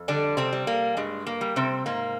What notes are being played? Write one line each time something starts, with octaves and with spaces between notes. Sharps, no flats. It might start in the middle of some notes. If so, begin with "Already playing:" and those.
Already playing: F2
D3 G3 D4
C3 C4
G3
A#3
G2 G#3
A#3
G3
C3 C4
G#2 A#3